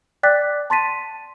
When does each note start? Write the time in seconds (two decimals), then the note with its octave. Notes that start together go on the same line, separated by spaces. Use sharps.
0.23 D5 G5 D6 F#6 A6 B6
0.70 A5 C6 A6 B6 D#7